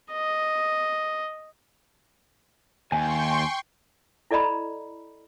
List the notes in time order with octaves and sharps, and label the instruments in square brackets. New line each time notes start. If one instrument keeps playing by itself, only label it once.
[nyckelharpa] D#5
[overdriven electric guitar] D#2 [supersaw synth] G5 C6 C#6 [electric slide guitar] G#5
[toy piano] E4 A4 D5 D#5 A#5 B5